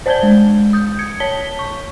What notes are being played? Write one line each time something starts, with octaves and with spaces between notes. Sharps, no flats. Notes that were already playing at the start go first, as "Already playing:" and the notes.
C5 D5 A5 G6 G#6 G7
G#3
D#6 G6
G#6 C#7
C#5 A5 B6 G7
C#6